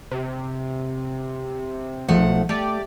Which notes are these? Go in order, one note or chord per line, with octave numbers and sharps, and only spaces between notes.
C3
B1 F3 A3 F#5
A3 G4 D5